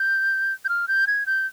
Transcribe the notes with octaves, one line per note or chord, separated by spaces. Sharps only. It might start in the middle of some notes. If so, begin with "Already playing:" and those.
Already playing: G6
G6
F6
G6
G#6
G6